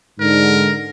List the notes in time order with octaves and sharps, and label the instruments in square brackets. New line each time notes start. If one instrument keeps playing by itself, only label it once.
[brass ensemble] G#2 D3 [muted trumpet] A#4